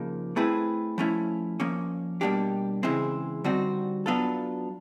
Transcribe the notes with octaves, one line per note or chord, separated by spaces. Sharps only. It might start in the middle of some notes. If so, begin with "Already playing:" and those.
Already playing: C#3 F3 A#3 D#4
A3 C4 E4 G#4 B4
F3 A3 C#4 E4
F3 A#3 C#4
B2 G3 A#3 D4 G4
C#3 E3 G#3 C4 E4
D3 G3 C4 D#4 F#4
F#3 B3 D4 F4 A4